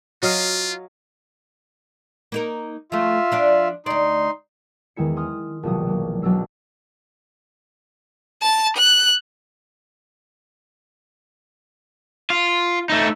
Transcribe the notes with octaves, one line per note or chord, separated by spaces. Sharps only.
F#3 F4 D#5 F5
A#3 D#4 A#4
F3 A3 F4 E5
F3 D4 D5
D2 D#4 D5 C6
E2 D#3 G#3 E4 C#7
G#5 C6 D#6 F6
E1 A#1 C3 F3 F#3 D#6
F#3 A#3
B1 F#3 D4 A#4 E6 C7
A5
F#6
F4
A3 D#4